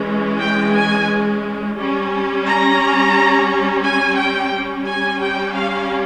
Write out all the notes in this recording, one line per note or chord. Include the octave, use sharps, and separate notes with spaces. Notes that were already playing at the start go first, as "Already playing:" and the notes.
Already playing: E3 G#3 C#4
G5
G#5
G3 C#4
A#5
G#5
G5
G3 C#4
G#5
G5
F5